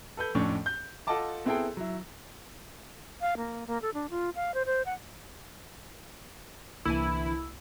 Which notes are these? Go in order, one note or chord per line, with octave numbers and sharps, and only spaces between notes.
A4 B4 G6
F2 A2 C#4 D4 C#6
G6
F4 A4 D#5 F#5 A5 D6
B3 C4 E4 G#4 A4 G5
F#3 E4
F5
A#3
A#3
A4
D4
F4
F5
C5
C5
F#5
C2 D3 E3 A#3 E4 G#5 E6